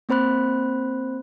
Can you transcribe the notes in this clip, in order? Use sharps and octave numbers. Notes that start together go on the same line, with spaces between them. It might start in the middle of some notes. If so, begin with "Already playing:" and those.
A#3 C4 C5 B5 F#6